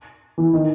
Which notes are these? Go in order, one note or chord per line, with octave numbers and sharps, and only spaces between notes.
E3
D#3